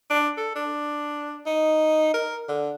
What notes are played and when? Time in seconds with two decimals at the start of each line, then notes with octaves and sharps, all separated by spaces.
0.10 D4
0.37 A4
0.55 D4
1.46 D#4
2.14 A#4
2.48 D3